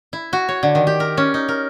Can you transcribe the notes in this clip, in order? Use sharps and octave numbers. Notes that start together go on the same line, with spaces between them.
E4
F#4
C#5
D3
D#3
G4
A#4
C#4
D#4
A#4